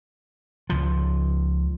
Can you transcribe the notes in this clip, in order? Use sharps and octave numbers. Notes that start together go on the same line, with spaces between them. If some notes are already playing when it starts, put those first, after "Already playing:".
C#2 F3